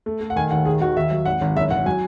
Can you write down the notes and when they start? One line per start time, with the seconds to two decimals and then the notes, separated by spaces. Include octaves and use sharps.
0.06 A3
0.21 A3
0.30 F#5
0.36 D#3 G#5
0.51 D#2 F#5
0.65 D#3 G#4
0.81 D#3 F#4
0.96 D#2 E5
1.11 F#3
1.26 G#1 F#5
1.41 G#1
1.56 F#1 E5
1.71 F#1 F#5
1.86 F#3 G#5